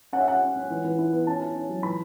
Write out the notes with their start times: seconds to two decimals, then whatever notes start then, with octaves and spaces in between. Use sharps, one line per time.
0.13 C#4 F#5
0.21 E5
0.27 C#4 F#5
0.42 C#4
0.56 C#4
0.70 E3
0.84 E3
0.98 E4
1.13 B3
1.27 C#4 A5
1.41 E4
1.55 C#4
1.69 F#3
1.83 E3 B5